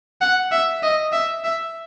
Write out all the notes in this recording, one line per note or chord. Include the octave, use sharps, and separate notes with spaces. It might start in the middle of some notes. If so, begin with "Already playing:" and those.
F#5
E5
D#5
E5
E5